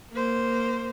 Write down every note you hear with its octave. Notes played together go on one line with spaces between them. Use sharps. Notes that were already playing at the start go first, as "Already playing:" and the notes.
A#3 C5